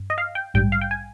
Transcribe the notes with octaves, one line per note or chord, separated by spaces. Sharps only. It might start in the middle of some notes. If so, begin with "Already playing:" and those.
Already playing: G2
D#5
F5
G5
A#1 G#2 G3 G5
F5
G5
G#5